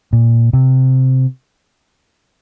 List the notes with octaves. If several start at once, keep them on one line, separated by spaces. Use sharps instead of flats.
A#2
C3